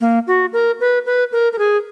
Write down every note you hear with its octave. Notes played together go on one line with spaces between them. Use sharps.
A#3
F#4
A#4
B4
B4
A#4
A#4
G#4